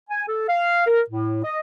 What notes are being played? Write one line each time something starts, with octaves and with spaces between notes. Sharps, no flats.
G#5
A4
F5
A#4
A2
D#5